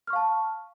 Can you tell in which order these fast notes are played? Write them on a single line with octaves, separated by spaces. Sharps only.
F6 C#6 F5 A5